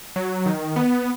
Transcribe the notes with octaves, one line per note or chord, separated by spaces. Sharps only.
F#3
D#3
B3